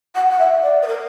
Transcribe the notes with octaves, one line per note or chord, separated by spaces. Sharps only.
F#5
F#5
E5
D5
B4
A#4